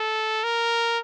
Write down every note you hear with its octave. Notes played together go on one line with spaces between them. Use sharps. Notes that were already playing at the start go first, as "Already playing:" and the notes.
Already playing: A4
A#4